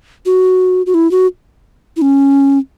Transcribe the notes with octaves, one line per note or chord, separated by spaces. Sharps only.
F#4
F#4
E4
F#4
E4
C#4